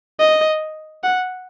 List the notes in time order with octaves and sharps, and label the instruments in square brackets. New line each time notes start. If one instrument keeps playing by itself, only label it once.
[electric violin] D#5
F#5